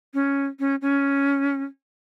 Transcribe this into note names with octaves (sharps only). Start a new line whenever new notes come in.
C#4
C#4
C#4